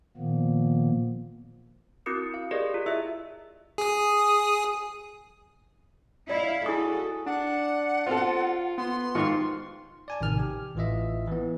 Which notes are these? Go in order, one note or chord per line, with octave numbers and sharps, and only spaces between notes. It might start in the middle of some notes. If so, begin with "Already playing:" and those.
A#2 D#3 F3 A#3 B3
C4 E4 F#4 A#4 D#6 C#7
F5
G4 G#4 A#4 D5 D#5
F4
E4 G#4 D#5 E5 E6
G#4 D#6
E4 D5 D#5 F5
E4 F#4 G#4 A4 D#6
D4 F#5
C4 F4 A4
B3 C6
G#2 D#3 F4 C#6
D5 G#5 A5
A1 C3 D#3 G#5 F6
G4
A1 E3 F4 D#5 E5
E3 B3